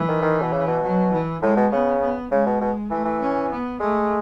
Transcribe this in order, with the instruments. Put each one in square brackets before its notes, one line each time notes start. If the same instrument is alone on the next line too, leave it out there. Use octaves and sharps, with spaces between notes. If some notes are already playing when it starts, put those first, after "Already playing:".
Already playing: [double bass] E3
[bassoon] D#3
D#3
B2
C#3
B2
[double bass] F#3
E3
[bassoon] A2 [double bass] G#3
[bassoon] B2
[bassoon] C#3 [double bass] B3
[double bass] B3
[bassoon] C#3 [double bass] G#3
[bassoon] B2
B2
[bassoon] E3 [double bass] A3
[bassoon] E3
[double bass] C#4
B3
[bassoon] G#3 [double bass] A3